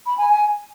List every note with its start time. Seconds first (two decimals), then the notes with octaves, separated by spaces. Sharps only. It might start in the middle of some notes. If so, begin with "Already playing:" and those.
0.06 B5
0.18 G#5
0.29 G#5